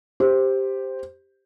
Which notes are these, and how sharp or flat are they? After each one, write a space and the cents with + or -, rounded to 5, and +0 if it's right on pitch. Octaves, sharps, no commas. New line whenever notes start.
G4 +5 C5 +0